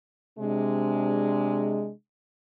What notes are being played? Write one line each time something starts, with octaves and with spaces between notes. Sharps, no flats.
C3 G#3 D4